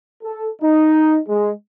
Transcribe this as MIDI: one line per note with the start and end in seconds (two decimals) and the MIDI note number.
0.23 0.48 69
0.62 1.19 63
1.28 1.52 56